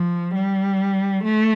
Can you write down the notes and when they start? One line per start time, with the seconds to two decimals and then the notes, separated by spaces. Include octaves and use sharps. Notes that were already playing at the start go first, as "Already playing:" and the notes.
Already playing: F3
0.35 G3
1.24 A3